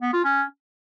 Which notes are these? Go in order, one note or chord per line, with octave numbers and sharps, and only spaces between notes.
B3
F4
C#4